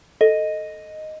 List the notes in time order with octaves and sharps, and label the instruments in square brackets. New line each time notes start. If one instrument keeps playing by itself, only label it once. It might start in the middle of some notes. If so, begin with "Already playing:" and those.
[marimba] A4 [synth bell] D#5